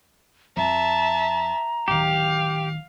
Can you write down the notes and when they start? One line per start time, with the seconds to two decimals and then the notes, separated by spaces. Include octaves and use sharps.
0.57 F2 E5 A5 A#5
1.88 D1 D#3 G4 F5